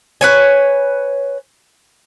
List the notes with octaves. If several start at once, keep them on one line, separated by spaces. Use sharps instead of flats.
B4 C#5 G#5